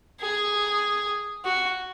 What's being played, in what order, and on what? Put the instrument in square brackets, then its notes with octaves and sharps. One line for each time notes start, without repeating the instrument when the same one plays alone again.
[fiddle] G#4
F#4